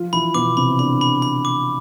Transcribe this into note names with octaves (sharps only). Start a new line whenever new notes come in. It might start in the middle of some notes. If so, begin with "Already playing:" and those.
Already playing: F3 F4
E3 E4 B5
B2 B3 D6
C3 C4 B5
D3 D4 B5
B5
B5
D6